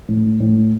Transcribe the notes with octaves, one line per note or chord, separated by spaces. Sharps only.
A2
A2